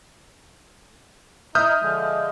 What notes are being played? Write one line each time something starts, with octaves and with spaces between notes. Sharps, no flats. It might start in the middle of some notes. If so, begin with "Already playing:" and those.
D#4 E4 E5 D#6 F6 G6
D3 F3 G#3